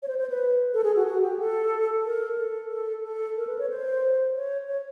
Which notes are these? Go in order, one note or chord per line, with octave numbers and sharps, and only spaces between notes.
C#5
C5
C5
B4
A4
G#4
F#4
F#4
G4
A4
A#4
A4
A4
A4
A#4
B4
C#5
C5
C#5
C#5